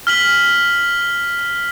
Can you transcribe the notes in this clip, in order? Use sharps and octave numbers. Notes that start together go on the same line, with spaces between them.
F6 B6 F#7